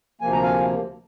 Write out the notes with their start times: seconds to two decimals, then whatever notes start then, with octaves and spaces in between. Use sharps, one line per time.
0.21 D2 C3 F3 A#3 G#5
0.32 A#5
0.43 F5 G#5